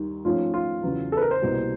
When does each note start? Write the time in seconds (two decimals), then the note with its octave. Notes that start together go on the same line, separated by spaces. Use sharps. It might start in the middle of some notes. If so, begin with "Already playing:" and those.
Already playing: D#2 D#3 G3
0.24 G#2 F3 A3 C#4 F4
0.54 F4
0.83 E2 C#3 F#3
1.12 A4
1.17 B4
1.22 A#4
1.31 C5
1.41 C2 B2 G3 A#3